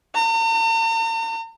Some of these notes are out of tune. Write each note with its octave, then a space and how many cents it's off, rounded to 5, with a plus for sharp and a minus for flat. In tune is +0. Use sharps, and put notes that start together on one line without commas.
A#5 -45